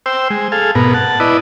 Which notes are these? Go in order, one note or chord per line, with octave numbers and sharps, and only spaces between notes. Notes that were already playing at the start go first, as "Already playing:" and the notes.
C5 G5 E6
G#3
G#4 A4 F5
G#2 B2 B3 A#4
F#5 A5
E4 B4 D5 D#5